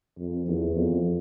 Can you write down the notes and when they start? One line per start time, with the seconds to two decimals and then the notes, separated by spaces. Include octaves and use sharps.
0.19 F2
0.48 E2
0.76 F2